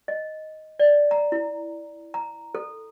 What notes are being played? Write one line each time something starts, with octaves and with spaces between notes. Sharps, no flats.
D#5
D5
A#5
E4
A#5
A4